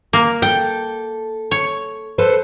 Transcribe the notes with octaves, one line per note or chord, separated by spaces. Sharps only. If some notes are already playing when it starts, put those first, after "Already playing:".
A#3
A4 G5
C#5
A4 B4 C5